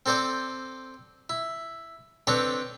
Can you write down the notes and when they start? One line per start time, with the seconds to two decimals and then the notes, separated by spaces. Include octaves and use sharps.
0.06 C4 A4 C5 D5 G5
1.30 E4
2.27 C4 D4 A4 B4 C#5 G5